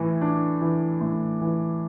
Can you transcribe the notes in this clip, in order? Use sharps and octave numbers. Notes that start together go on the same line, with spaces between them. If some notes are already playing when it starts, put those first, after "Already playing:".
Already playing: A2 E3
D4
E3
A2
E3